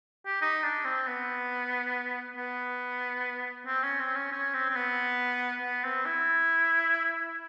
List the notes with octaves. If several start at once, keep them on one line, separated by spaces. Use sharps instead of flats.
G4
D#4
D4
C4
B3
B3
C4
C#4
C4
C#4
C#4
C4
C4
B3
B3
C4
E4